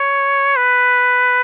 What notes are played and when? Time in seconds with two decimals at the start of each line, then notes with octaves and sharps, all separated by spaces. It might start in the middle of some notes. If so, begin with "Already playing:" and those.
Already playing: C#5
0.57 B4